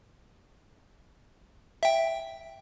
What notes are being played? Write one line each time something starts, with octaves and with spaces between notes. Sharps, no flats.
E5 G5